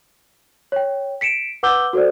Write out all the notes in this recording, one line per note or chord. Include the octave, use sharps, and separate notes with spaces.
C#5 G5
B6 C#7 D7 E7
B4 F#5 D6 E6 G6 G7
F#4 A4 C5 D5